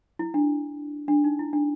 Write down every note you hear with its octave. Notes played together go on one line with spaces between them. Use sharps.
E4
D4
D4
D#4
E4
D4